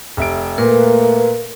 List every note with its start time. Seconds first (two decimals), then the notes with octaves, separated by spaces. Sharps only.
0.17 F1 E5 D7
0.58 A#2 A3 A#3 A#4 B4